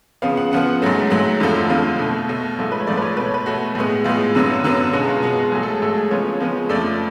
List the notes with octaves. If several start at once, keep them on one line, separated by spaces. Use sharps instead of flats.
C#3 F3 B3 F5
F#5
C#3 F3 B3 F#5
G#2 F#3 A3
G#2 F#3 A3 F#5
F2 D3 F3 A3
F2 D3 F3 A3 F5
B2 A3
B2 A3
G#2 F3 A3
B4
C#5
G#2 F3 A3 D5
B4
C#5
B2 A3 B4 C#5
B4
B2 A3 F#4
A2 G#3 B3
A2 G#3 B3 F4
F#2 D3 F#3 B3
F#2 D3 F#3 B3
B2 G#3 B3 F#4
F4
B2 G#3 B3 F#4
G#2 F#3 A3 G#4
A4
G#4
G#2 F#3 A3 A4
G#4
C#3 F3 G#3 B3 C#5
C#3 F3 G#3 B3
F2 F3 A3 D5